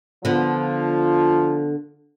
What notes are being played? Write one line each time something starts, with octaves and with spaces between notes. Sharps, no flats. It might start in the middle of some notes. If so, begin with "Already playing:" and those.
D3 F3 B3 F4